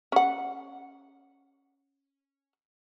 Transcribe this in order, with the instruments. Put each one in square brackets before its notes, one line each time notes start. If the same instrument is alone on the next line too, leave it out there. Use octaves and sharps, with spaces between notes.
[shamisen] C#4 F#5